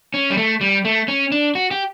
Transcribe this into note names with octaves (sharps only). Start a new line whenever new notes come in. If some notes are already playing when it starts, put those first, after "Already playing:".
C#4
G3
A3
G3
A3
C#4
D4
F#4
G4